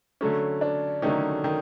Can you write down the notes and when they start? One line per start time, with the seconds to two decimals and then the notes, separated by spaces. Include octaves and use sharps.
0.21 D3 F#3 A3 C#4
0.61 D4
1.02 D3 D#3 F#3 A3 C#4 D#4
1.44 D#3 D#4